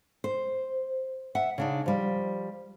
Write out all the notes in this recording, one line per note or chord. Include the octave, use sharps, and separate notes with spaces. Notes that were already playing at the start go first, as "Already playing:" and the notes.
C5
E5 F#5
C#3 D4 D#4
F3 G3